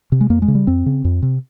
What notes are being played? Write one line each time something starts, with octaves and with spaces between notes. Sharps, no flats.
C3
G#3
F2 A#3
G#3
C#3
G3
F2 C4
C#3
F2
C3